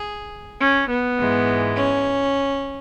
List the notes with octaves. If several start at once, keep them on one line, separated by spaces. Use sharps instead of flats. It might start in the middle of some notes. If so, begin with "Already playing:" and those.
Already playing: G#4
C#4
B3
G#2 E3 G#3
C#4